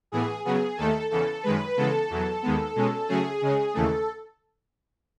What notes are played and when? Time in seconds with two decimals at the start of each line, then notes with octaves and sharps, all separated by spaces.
0.12 A2 E3 B3 G#4
0.45 C#3 F#3 B3 G#4
0.77 D#2 D#3 A3 A4
1.11 E2 C#3 E3 A4
1.43 F#2 D#3 G#3 B4
1.77 C#3 E3 G#3 B3 A4
2.10 E2 B2 F#3
2.42 D#2 D#3 G#3 B3
2.75 B2 G#3 C#4
3.08 C#3 F#3 A3 C#4 G#4
3.42 C#3 G#3 C#4
3.74 D#2 C#3 E3 A3 A4